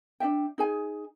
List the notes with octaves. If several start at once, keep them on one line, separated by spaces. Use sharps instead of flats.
D4 F#4 E5 G5
D#4 G#4 G#5